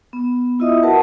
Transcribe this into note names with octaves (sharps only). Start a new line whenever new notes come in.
B3
B3 E4 F4 D#5 E5 D#6
F#4 A#4 B4 F#5 A5